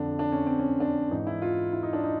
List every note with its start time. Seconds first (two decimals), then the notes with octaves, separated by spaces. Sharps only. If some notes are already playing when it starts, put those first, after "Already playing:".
Already playing: F2 D3 D4
0.19 D4
0.32 C#4
0.46 C4
0.60 C#4
0.80 D4
1.11 G#2 E3 D#4
1.27 E4
1.42 F4
1.73 E4
1.83 D#4
1.93 D4
2.04 D#4